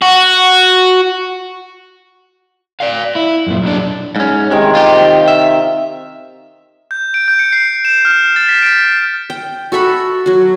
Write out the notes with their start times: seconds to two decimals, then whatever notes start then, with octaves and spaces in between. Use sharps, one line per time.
0.02 F#4
2.80 D5 F5
3.15 E4
3.47 F#2 A#2
3.62 B1 D4
4.16 G#2 C#4
4.51 C3 D#3 G#3 A#4
4.75 F4 G4
5.28 E5
6.91 G6
7.14 D7
7.28 G6
7.39 C#7
7.52 C7
7.85 E7
8.05 F6
8.36 A6
8.49 B6
8.62 D7
9.30 G5
9.72 F#4 A4 E5 B5
10.26 F#3 F#4